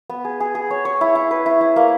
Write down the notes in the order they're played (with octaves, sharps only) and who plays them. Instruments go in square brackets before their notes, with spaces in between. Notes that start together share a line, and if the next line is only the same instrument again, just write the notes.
[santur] B3
G#4
G#4
G#4
C#5
C#5
E4
E4
B4
E4
E4
A#3